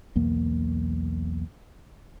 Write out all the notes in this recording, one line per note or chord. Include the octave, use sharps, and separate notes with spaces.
B1 E2 A#3